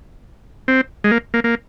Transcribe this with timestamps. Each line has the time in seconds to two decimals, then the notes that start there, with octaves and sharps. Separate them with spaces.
0.68 C4
1.04 G#3
1.11 A#3
1.34 A#3
1.44 A#3